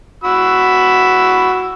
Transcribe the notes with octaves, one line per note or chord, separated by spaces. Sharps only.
F#4 B5 E6